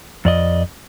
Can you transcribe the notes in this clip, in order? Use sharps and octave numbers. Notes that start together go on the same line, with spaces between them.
F2 D5 D#5